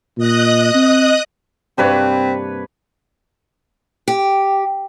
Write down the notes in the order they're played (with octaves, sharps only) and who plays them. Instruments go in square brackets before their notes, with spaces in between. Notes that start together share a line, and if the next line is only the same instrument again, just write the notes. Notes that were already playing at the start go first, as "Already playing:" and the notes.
[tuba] A#2 [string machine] D#5 D#6 F#6
[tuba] C4
[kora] G2 C3 A#3 [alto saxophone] C4 [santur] D4 B4 C#5
[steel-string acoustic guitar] G4